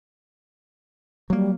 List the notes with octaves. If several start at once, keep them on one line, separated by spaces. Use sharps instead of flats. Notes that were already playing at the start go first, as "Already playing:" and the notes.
F#3 G3 A#3